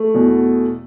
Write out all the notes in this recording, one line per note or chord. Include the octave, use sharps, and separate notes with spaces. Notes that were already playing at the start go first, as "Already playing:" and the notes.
Already playing: A3
E2 B2